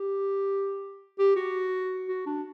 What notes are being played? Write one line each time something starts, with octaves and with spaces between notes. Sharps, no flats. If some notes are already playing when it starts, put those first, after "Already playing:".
Already playing: G4
G4
F#4
F#4
D4